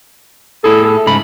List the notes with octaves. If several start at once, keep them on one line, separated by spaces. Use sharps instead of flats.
A2 E4 G#4 A4
A4
G#2 C#3 B5